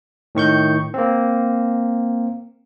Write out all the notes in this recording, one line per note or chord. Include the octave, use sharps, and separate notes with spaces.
A2 D#3 C#6 G6
A#3 C4